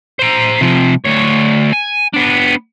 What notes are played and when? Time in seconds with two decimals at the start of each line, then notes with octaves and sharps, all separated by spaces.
0.19 C5 A#5
0.61 C3 F3
1.05 D2 C#5
1.72 G#5
2.14 B3 D4